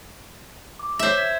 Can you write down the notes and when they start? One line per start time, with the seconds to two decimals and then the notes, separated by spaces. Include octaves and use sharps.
0.79 D6
0.99 C5 C#5 E5 D6
1.17 G#6 B6